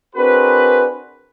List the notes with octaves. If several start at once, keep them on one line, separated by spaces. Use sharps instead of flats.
C4 D4 F#4 G#4 A#4 B4